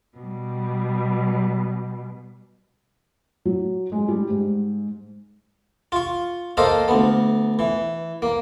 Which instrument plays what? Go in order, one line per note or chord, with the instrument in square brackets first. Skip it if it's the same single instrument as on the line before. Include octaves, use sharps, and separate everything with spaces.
[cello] B2 G3
[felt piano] F#3
G#3
G3
G#2
[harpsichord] F4 C#6
A#3 A4 C5 D#5 F5
D2 B3
E3
A#3